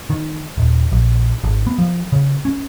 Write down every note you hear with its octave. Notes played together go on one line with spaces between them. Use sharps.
D#3
D#1
A#1
G#1
B3
F3
C#3
C#4